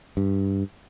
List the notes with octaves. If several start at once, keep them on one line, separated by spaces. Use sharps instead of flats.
G2